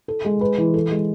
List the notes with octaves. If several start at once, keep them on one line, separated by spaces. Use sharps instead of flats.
A4
G#3
B4
E3
A4
G#3